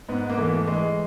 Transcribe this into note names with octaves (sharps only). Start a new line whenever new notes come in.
G#2 B3
A#3
E3 A3
E3 G#3